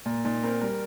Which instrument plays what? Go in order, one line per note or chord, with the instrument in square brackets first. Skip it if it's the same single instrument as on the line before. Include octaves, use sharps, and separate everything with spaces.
[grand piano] A#2 [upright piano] A#3
[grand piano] A#2 [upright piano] D#4
[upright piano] C4 [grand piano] A#4
[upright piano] G3 [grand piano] A#4